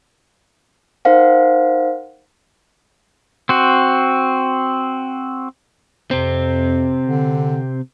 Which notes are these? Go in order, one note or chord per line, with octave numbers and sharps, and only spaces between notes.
D#4 A#4 C5 F5 F#5
C4 F#4
F2 C3 C4
D3